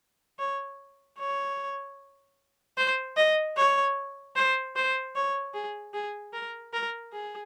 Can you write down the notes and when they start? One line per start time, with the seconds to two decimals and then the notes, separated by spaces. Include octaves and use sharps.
0.39 C#5
1.19 C#5
2.77 C5
3.17 D#5
3.57 C#5
4.36 C5
4.76 C5
5.15 C#5
5.54 G#4
5.94 G#4
6.33 A#4
6.73 A#4
7.13 G#4